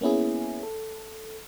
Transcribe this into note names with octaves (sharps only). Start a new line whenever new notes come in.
A#3 B3 C#4 E4 G#4
A4